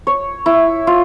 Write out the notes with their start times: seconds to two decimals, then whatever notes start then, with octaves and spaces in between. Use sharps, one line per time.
0.07 C#5
0.46 E4
0.87 F4